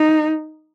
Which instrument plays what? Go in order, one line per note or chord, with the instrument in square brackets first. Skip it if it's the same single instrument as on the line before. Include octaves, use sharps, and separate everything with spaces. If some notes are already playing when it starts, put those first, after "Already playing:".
Already playing: [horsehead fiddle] D#4